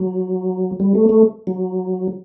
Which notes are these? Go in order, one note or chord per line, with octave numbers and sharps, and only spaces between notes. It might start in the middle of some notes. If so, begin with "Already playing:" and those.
Already playing: F#3
G3
A3
A3
F#3